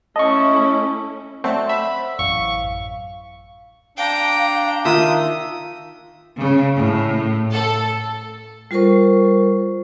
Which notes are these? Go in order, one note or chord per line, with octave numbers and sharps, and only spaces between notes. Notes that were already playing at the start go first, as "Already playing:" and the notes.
A3 C#4 E4 D#5 A5 C#6
F#3 A3 C4 C5 D5 F#5
E5 B5 E6
A1 F#2 F5 C#6
D4 F5 G5 A#5
D#3 F4 E5 D#6
C#3
A2
A4
G3 F4 A4 A#4 C5 C#6